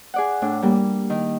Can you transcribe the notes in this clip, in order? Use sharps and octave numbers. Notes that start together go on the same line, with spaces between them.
G#4 D5 F#5
A2 D4
G3 A#3
D#3